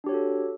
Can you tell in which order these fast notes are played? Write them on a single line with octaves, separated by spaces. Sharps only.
D4 G4 C#5 F#4 A4